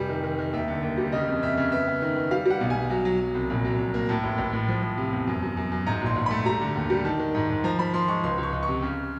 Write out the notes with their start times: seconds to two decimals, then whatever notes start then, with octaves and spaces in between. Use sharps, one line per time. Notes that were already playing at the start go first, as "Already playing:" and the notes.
Already playing: F1 G3
0.09 D#3
0.24 D#3
0.39 D#3
0.53 D#2 E5
0.68 D3
0.82 D#2
0.98 G3
1.12 C#3 D#5
1.27 F2
1.42 C#3 E5
1.57 C#3
1.72 B3 E5
1.87 B3
2.02 D#3
2.16 B3
2.31 G3 F5
2.46 G3 F#5
2.61 B1
2.70 G#5
2.76 B1
2.90 F#3
3.05 F#3
3.19 F#3
3.34 C2
3.50 A#1
3.65 F#3
3.79 A#1
3.94 A#3
4.09 A2 A5
4.23 A1
4.38 A1
4.53 A2
4.68 F3
4.83 F3
4.97 C3
5.13 E2
5.27 F#2
5.42 F#2
5.57 F#2
5.72 F#2
5.86 G#2 A#5
6.02 A#1 C6
6.16 A#1
6.26 B5
6.31 A3
6.45 G3 A#5
6.61 D3
6.75 D#2
6.90 G3
7.05 D#3 A5
7.19 D#3
7.34 G#2
7.50 G#2
7.64 F3 A#5
7.79 F3 B5
7.93 F3 C6
8.08 G#3 C#6
8.23 C#2 C6
8.38 C#2
8.43 C#6
8.52 C#2
8.63 C#6
8.68 C3
8.82 C#3